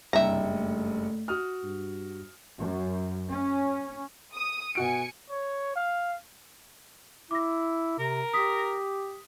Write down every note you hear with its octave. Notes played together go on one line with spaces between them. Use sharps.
F#1 C2 G2 E5 G5 A#5
A3
F#4 D#6 F6
G2
F#2
C#4
D#6
B2 F#4 G#5 C#7 D7
C#5
F5
E4 D6 A#6
C3 A#4
G4 D#6 B6